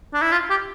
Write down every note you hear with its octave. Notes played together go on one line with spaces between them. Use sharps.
D4
E4
F4
G4